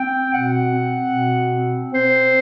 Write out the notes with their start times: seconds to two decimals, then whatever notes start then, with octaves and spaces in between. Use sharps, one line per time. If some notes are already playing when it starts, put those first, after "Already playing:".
Already playing: C4 G5
0.33 B2 F#5
0.73 C4
1.13 B2
1.53 C4
1.93 C4 C5